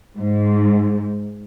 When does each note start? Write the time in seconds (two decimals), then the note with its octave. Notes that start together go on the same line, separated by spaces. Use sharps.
0.19 G#2